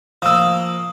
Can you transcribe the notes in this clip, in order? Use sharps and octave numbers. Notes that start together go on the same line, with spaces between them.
F3 A#3 D#6 E6